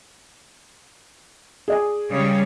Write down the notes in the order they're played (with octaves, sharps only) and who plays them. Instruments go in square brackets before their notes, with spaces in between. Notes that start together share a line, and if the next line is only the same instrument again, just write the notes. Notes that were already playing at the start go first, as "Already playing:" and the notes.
[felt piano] G#4 D5 G#5
[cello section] C#3 G3 C#5